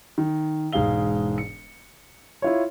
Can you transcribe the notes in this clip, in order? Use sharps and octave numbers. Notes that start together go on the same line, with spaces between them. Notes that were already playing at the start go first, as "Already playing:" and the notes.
D#3
E1 G#2 G#4 F5 G7
C#7
E4 F4 C#5